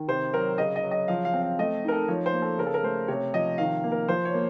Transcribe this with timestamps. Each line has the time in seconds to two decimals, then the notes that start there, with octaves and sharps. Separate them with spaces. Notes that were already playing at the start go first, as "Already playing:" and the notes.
Already playing: D#3
0.08 C3 C5
0.33 F#3 A#4
0.58 C#3 D#5
0.76 D#5
0.83 F#3
0.91 D#5
1.08 F3 F5
1.25 F5
1.33 C4
1.42 F5
1.59 A3 D#5
1.84 D#4 A#4
1.92 A4
2.08 F3 C#5
2.26 C5
2.33 A#3
2.42 A4
2.58 C#3 A#4
2.66 A4
2.74 A#4
2.83 A3 C5
3.08 C3 C#5
3.34 F3 D#5
3.58 D#3 F5
3.84 A#3
3.92 A#4
4.08 F3 C5
4.25 C#5
4.34 A#3